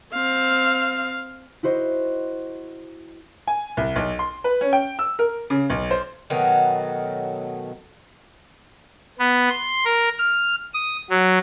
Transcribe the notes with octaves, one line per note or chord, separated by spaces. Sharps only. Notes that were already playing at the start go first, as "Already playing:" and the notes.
C4 F5
E4 F#4 C5 D#5
G#5
C2
B1
C6
B4
C#4
G5
E6
A#4
C#3
B1
C5
B2 D#3 F#3 A3
B3
C6
A#4
F6
D#6
F#3